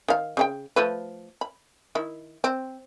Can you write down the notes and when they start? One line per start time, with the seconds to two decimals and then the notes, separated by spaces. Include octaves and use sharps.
0.08 D#3 F5
0.37 C#3 D4 G5
0.76 F3 A3 B4
1.41 B5
1.95 D#3 E4
2.44 C4